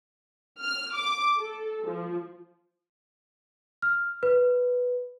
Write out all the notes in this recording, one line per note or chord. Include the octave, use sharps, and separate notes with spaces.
F6
D6
A4
F3
F6
B4